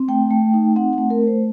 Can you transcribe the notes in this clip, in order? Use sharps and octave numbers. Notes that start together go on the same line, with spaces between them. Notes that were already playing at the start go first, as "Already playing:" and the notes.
Already playing: C4
A3 G5
A3
D#4
C4 F#5
A3 F#5
A#4
A3
C5